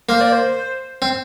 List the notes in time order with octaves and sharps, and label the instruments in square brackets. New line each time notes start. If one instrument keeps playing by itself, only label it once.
[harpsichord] A#3 [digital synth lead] C5
[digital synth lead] D5
C5
[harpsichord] C4